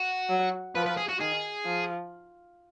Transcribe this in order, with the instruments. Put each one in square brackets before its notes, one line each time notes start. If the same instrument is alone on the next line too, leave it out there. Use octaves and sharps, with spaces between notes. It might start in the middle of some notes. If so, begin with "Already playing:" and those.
Already playing: [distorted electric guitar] F#4
[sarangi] F#3
[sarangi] F3 [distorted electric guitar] B4
[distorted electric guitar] B4
G#4
F#4
[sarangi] D#3 [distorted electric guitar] G#4
[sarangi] F3